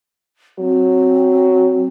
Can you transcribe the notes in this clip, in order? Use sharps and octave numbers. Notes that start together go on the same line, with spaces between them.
F#3 C4